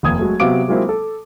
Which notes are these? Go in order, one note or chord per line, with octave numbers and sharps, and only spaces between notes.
F1 D#2 D#6 G#6
F#3 G#3 A3
C3 F#3 B3 F5 D6 D7
F#3 G#3 A#3 C4 E4 F4
A4